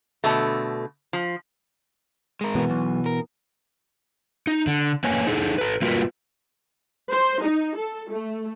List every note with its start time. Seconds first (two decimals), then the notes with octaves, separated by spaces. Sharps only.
0.24 B2 D3 A3
1.13 F3
2.41 G#3 A#4
2.55 B2 E3 B3
2.70 B1
3.06 A#4
4.47 D#4
4.67 D3
5.04 A#3 B4 C#5 G#5
5.27 D#4 G#4 A4
5.58 A4 B4
5.82 G3 A#3 F4 F#4 A#4 B4
7.11 C5
7.42 D#4
7.76 A4
8.11 A3